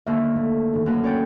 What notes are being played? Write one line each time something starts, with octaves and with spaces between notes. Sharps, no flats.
D#2 D3 A#3 E5
A3
D#3 D#4 A4
F#2 A#3 B4
C#4 C#5 D5 G5